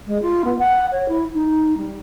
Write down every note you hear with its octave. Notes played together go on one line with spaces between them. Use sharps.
G#3
F4
B3
F#5
C#5
E4
D#4
G3